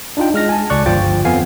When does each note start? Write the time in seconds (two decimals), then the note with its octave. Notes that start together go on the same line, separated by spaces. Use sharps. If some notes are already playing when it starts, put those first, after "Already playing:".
0.17 D4 D#4 F4 G5
0.34 G#3 F6 A#6
0.49 G#5 A5
0.70 C#2 D5 C#6 F#6
0.86 G1 F3 F4 G5 A6
1.25 F2 B3 F5 G#5 C7